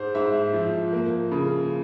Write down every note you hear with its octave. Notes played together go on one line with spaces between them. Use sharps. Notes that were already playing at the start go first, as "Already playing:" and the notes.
Already playing: G#2 G#3 C5
G#2 E5
F3
A#3
C#3